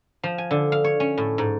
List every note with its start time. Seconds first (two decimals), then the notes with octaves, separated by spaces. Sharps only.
0.23 F3
0.38 G#5
0.51 D3
0.72 F5
0.84 C#5
1.00 C#4
1.18 A2
1.38 G#2